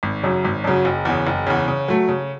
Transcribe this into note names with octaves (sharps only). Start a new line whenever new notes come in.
G#1
F#2 C#3 F#3
G#1
F#2 C#3 F#3
F#1
E2 C#3
F#1
E2 C#3
C#3
F#3 A3
C#3